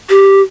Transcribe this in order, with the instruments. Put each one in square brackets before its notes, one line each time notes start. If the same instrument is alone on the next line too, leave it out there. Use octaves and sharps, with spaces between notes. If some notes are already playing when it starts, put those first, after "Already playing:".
[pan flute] G4